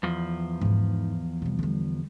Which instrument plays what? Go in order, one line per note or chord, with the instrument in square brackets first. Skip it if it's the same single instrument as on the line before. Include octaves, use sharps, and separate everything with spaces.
[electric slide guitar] E2 F3
[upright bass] G#2 D#4
C3 G3
D3 G3